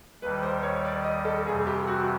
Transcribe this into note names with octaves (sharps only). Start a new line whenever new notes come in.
D#2 D#3 G3 B4
C5
C#5
D5
D#5
A4
F2 C3 E3 G3 G#4
G4
F#4